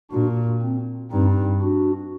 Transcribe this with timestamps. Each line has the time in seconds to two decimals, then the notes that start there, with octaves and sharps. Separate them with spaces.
0.11 A#2 D4 F#4
0.62 C4
1.11 G2 C4 D#4
1.62 D4 F#4